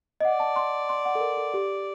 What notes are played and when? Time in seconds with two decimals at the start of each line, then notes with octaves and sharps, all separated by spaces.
0.20 D#5
0.25 D5 F#5
0.40 A5
0.56 C6
0.89 C6
1.05 F#5
1.15 A4
1.20 A#4
1.37 A4
1.54 G4